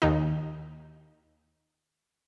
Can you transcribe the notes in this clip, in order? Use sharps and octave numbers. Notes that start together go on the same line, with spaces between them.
D#2 D#3 D#4